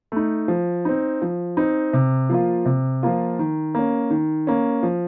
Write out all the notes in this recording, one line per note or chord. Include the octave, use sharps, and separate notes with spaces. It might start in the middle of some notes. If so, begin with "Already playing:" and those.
A3 D#4
F3
C4 D#4
F3
C4 D#4
C3
F3 A#3 F4
C3
F3 A#3 F4
D#3
A#3 C#4
D#3
A#3 C#4
F3